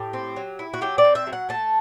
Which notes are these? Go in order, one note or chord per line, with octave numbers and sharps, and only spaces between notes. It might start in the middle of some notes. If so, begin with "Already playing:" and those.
Already playing: A2 G4
C4
F#3
E4
F#4
F#3 G4
D5
C4
E5
F#3
F#5
A3 A5